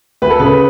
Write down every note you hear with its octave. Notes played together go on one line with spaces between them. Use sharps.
D2 B4
A4
C#3 B4